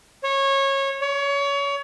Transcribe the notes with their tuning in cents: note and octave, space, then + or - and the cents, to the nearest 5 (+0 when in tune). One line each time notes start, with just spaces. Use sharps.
C#5 -20
C#5 +25